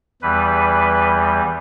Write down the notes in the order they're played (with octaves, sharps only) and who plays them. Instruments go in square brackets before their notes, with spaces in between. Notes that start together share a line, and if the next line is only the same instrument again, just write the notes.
[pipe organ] E2 E3 G3 B4